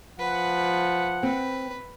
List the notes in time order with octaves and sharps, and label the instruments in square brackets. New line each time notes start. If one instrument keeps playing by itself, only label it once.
[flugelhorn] F3 [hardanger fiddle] B4 [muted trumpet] F#5
[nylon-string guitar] C4 [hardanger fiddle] B4